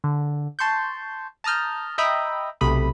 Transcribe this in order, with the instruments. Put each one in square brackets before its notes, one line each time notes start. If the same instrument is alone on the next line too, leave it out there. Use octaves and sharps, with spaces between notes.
[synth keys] D3
A5 C6 C#6 G6
A5 A#5 D#6 F6 G6
D#5 E5 G5 A#5 B5 D#6
B1 C3 A3 B5 D#6